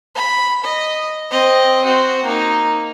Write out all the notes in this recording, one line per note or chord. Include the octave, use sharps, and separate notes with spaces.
B5
D#5
C4 D#5
C4 F#4
A#3 D#4